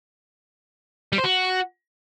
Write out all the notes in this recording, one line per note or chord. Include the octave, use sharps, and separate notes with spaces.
G3
C5
F#4